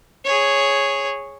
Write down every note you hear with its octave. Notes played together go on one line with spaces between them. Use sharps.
G#4 C#5